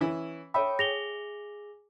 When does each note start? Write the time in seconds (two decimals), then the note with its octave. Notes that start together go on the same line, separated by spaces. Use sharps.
0.01 E3 C#4 E4
0.54 A4 C#5 E5 G5 B5
0.79 G#4 A#6 F7 G7